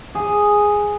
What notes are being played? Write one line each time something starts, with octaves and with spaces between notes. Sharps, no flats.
G#4